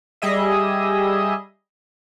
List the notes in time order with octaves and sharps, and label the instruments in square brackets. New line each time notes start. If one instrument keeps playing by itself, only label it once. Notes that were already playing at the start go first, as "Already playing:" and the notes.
[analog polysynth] G3 G#4 D#5 E5